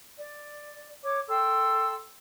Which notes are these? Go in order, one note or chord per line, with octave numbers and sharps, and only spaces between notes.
D5
C#5 D6
A4 G5 C6 E6